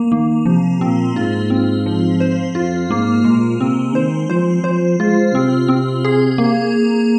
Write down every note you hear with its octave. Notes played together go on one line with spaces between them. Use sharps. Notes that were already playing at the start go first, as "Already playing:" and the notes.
Already playing: A#3
D#3 A#3
C3 F3
A#2 C4
G#2 F4
C4
F3
C5
F2 F4
G#2 A#3
A#2 G#3
C3 C4
D#3 C5
F3 C5
F3 C5
G#3 F4
C3 C4
C4
G#4
A#3